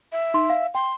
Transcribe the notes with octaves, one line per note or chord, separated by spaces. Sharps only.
E5
D#4 C6
F5
G5 C6